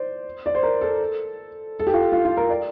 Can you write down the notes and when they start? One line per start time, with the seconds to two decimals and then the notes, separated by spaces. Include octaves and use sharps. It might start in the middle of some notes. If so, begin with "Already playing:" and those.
Already playing: C5 D5
0.46 D5
0.55 C5
0.63 A#4
0.81 A4
1.80 A4
1.87 G4
1.93 F4
2.12 F4
2.25 F4
2.37 A#4
2.49 D5